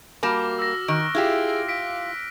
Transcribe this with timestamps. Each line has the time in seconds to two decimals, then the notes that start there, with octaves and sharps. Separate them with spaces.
0.23 G3 A#3 F#4 A5 D6 F6 A#6
0.59 E6 A#6
0.88 D#3 F6 F#6 D7
1.15 E4 F4 G4 G#4
1.68 F5 B6 D7